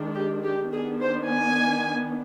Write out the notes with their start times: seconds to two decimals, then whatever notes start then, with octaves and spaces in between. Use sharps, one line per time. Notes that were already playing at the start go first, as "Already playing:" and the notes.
Already playing: D#3 G#3 D4
0.14 G4
0.43 G4
0.72 D#3 B3 D4 G#4
1.01 C5
1.30 G#5